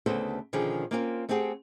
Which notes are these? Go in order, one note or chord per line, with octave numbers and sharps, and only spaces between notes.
D2 C#3 B3 A4 C5
B2 D3 D#3 F3 C#4 G#4
A#3 C4 C#4 F4 G4 A#4
A3 C4 G4 G#4 F#5